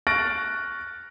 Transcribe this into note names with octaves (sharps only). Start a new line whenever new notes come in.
C#6 F6 F#6 A6 A#6 D7